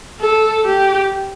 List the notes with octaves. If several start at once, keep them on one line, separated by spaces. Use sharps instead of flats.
A4
G4